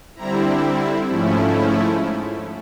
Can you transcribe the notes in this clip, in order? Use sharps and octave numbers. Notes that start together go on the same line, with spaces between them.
D3 G3 C4 E4 A#5
G#2 F3 A3 C#4 E4